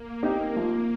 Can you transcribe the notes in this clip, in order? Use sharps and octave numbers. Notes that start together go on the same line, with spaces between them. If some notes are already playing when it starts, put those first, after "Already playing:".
Already playing: A#3
C4 D#4 G4
F3 A#3